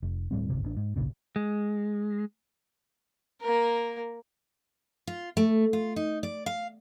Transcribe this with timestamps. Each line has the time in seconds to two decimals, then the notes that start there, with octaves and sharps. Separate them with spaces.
0.02 F1
0.31 D1 A2 G3 C4
0.49 D1 G1 C3
0.64 A1 D4
0.76 G#2
0.96 G#1 C#2 A#2 C#3
1.36 G#3
3.41 A#3 A#4
5.07 F4
5.37 A3
5.73 F4
5.96 D#4
6.23 D5
6.46 F5